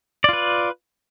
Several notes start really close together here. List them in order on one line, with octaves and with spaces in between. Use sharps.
D5 F4 B4